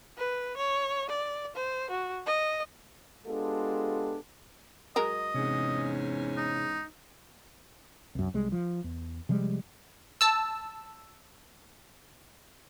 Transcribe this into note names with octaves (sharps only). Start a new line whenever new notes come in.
B4
C#5
D5
C5
F#4
D#5
G#3 B3 D4 F4 G4 A4
F#3 G#3 A#4 D#5
E2 G#2 C3 C#4
D#4
C2 F#2
C2 G3 G#3
F3
E2
C3 F3 G3 G#3
A5 E6